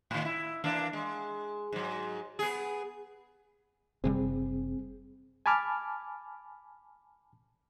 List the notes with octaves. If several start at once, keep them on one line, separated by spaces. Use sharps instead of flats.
A2 D#3
E4
E3 A#3 D4
G#3
G#2 F#3
B3 G#4
F#1 C3 G3 C4 G#4
G#5 A5 B5 D6 F6